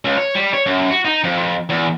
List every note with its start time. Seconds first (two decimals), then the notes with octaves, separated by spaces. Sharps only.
0.05 C#2
0.17 C#5
0.35 G3
0.54 C#5
0.67 F#2
0.91 F#4
1.05 D#4
1.24 F2
1.69 E2